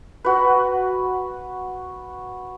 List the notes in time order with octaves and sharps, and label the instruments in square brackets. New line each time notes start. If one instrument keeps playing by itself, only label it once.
[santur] F#4 B4